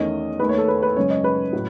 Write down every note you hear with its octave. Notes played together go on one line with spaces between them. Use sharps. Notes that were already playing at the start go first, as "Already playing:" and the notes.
Already playing: E2 D#3 A3 C#4 D#5
D#2 D#3 A3 B4
C#5
A4
B4
B4
F#2 C#3 G#3 C#4 C#5
D#5
B4
A2 F#3